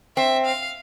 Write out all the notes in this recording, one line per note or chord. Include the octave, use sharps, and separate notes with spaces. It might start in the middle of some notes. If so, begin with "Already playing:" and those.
C4 E5
F5